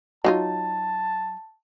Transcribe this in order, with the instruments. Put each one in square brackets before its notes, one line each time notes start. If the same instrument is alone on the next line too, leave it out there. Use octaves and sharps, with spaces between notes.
[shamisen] F#3 D#4 F4 [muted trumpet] A5